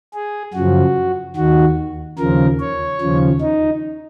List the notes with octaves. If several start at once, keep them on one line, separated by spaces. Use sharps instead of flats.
G#4
F#2 C#3 F3 F#4
D#2 D#3 F#4
D#2 C#3 F3 A#4
C#5
D#2 C#3 F3
D#4